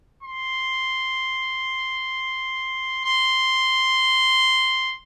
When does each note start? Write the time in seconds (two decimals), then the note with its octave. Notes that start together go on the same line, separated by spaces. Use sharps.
0.23 C6
3.05 C6